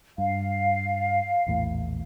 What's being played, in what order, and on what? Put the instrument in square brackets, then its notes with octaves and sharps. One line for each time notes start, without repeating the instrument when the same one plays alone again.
[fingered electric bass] G2 [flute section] F5
[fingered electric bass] A#1 E2 A2